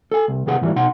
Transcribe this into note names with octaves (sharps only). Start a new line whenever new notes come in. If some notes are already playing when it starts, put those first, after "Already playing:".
A4 G#5
C2
D#2 C3 B3 G#4 F#5
G#2 E3 F#3 G3
B2 D#4 F#5 C6